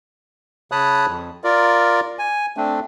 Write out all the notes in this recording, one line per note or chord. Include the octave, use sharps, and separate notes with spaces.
C#3 C#5 A5 B5 D#6 F#6
F2
F4 A#4 D5
G#5
A3 C4 D4